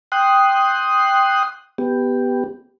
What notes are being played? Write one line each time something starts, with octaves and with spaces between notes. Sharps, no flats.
G5 C6 D#6 F#6
B3 G4